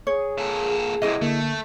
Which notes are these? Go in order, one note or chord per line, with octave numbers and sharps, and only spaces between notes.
G#4 C#5
A#2 A4
B1 C3 E4 G#4 D#5
D3 A3 A#3